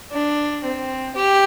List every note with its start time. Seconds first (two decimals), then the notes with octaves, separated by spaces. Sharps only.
0.12 D4
0.64 C4
1.15 G4